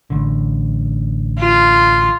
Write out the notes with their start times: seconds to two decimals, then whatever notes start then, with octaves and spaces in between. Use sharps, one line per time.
0.10 A1 D3
1.39 F4